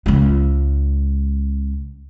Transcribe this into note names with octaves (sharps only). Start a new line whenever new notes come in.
C#2 G#3